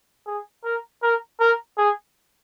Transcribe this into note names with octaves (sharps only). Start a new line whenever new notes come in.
G#4
A#4
A#4
A#4
G#4